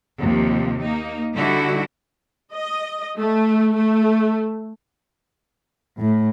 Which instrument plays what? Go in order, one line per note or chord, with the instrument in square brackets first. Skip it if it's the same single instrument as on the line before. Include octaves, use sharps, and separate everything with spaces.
[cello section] D#2 C3 F3
A#3 D#4
D3 G3 D#4 E4 F#4
[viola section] D#5
A3
A3
[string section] A2